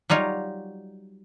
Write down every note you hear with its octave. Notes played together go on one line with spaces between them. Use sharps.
F#3 G3 D#4 F4 C#5